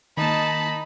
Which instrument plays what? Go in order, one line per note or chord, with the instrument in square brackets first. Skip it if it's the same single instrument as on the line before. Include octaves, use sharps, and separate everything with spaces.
[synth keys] D#3 A#3 [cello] D#4 [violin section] A5 [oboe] B5